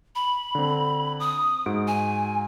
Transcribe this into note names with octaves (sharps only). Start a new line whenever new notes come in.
B5
D3 C4
D#6
G#2 F#4 D7
G#5